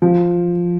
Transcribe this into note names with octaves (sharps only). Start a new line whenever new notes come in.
F3